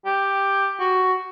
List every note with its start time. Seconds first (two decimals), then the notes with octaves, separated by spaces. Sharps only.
0.06 G4
0.80 F#4